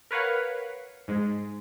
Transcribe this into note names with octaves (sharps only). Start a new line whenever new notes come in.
A#4 B4 C#5 F5 F#5
G#2 G#3